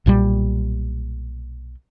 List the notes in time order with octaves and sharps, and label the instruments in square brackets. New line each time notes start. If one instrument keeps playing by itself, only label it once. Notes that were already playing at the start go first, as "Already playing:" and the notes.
[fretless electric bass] B1 A#2 F3 G3